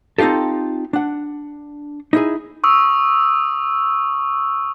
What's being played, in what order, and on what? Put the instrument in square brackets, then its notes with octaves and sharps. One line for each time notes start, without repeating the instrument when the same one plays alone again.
[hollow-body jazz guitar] C4 D#4 F4 G4 A4
D4 F#5
D#4 E4 G#4
[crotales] C#6 D#6 E6